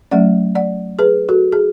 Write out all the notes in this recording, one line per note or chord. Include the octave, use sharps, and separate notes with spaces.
F#3 A3 C#4 D5 F#5
D5 F#5
G#4 B4
F#4 A4
G#4